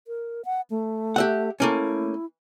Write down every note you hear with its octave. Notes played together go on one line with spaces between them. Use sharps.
A#4
F#5
A3
G4 E5 F#5
A3 A#3 C#4 E4